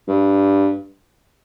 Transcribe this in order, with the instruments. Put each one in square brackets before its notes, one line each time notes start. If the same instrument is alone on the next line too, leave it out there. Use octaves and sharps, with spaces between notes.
[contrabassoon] G2